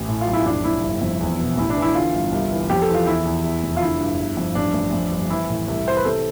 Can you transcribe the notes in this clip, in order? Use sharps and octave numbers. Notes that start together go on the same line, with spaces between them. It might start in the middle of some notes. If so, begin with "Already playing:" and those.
Already playing: A1
A2
F4
B1
E4
F1 D4
F1 E4
G1
F2
E2
B2
A1 E4
D4
E3
E4
D3 F4
G1
C2
E3
F2 G4
A4
E3
F4
E2 E4
E2
E2
F1
F4
D3 E4
G2
G1
F2
A1 D4
A1
F2
G1
E3 E4
A2
C2
E3 C5
B4
C3 A4